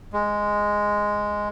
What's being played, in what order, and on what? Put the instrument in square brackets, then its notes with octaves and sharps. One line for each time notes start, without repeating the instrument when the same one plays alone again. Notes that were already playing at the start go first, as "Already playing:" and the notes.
[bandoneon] G#3